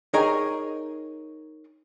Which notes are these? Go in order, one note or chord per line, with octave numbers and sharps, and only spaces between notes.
D#4 G#4 A#4 C#5 D#5 G5